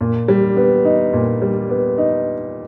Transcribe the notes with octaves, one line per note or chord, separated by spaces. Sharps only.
A#2
G3
B3
D#4
A#2
G3
B3
D#4